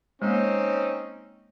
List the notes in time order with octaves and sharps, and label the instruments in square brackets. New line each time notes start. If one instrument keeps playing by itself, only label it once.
[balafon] G#3 A#3 [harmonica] C4 C#4 D#4